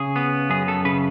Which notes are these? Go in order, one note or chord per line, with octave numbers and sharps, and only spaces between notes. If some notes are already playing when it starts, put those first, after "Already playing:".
Already playing: C#3 G#4
B3
F#2 G#4
A4
C#3 B4